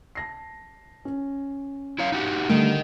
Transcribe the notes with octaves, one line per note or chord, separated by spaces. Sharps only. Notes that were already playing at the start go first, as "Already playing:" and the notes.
A5 A#6 C7
C#4
E4 C#5 F5
D#4 F#4 G4
D3 G3 A3 A#4 D#5